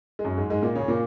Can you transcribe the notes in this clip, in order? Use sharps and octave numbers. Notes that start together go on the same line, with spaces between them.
G#3
F#2 F#3
G#2 G#3
G#2 G#3
A#2 A#3
C#3 C#4
A#2 A#3